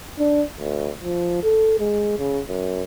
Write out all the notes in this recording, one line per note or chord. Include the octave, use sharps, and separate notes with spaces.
D4
D2
F3
A4
G#3
C#3
F#2